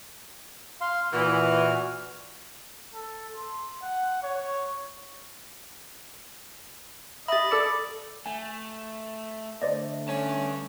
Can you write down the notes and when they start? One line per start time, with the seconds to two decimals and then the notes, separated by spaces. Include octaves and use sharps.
0.81 F5 C6
1.13 A#2 E3 F#4 F6
2.94 A4
3.35 C6
3.83 F#5
4.23 C#5
7.28 G4 D#5 E5 B5 A6
7.51 A4 D5 E6 C#7
8.26 A3 G#5
9.62 D3 A3 C5 D5 D#5
10.08 G3 C#4 A5